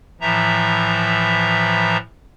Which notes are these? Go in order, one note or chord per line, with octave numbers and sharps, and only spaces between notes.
A2 E3 F3 E5 A#5